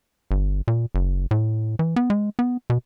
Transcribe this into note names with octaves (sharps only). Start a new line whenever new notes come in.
G1
A#2
F#1
A2
E3
B3
G#3
B3
B2